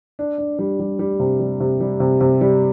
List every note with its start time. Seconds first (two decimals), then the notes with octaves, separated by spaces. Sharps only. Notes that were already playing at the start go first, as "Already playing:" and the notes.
0.19 D4
0.38 D4
0.59 G3
0.80 G3
0.99 G3
1.20 C3
1.40 G3
1.60 C3
1.81 G3
2.00 C3
2.21 C3
2.41 G3